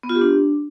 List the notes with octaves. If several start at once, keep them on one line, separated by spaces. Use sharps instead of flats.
B3
F4
G4
D4